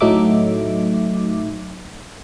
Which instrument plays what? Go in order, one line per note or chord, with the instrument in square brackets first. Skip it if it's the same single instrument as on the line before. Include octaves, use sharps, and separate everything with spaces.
[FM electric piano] A2 F#3 A3 D#4 E5 D6